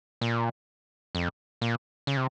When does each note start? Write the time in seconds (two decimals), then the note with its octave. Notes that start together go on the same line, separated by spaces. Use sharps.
0.21 A#2
1.15 F2
1.61 A#2
2.07 C#3
2.17 C3